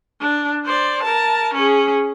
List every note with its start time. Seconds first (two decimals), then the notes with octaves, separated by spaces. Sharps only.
0.20 D4
0.65 C5 D5
1.03 A#4 A5
1.54 C#4 G#4